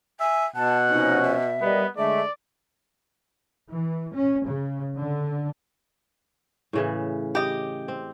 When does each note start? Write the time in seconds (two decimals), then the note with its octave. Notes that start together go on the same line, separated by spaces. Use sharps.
0.20 E5 G#5
0.56 B2 F#5 A5
0.90 C3 F3 C#4 D#4
1.23 E5
1.61 G3 B3 A#4 D#5
1.97 D3 G#3 A3 D5 E5
3.68 E3
4.14 C#4
4.45 C#3
4.95 D3
6.73 A2 C#3 E3
7.35 G4 D#5
7.88 C4